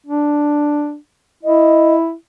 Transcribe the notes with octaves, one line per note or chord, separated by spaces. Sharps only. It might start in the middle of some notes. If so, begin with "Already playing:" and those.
D4
E4 D#5